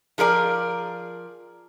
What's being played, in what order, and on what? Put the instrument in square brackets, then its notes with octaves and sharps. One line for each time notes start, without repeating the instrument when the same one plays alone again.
[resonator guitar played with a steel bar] F3 G#4 A#4 D5